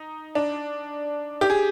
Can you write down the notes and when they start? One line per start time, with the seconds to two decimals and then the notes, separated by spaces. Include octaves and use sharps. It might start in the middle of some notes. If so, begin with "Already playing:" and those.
Already playing: D#4
0.35 D4
1.41 G4
1.50 G#4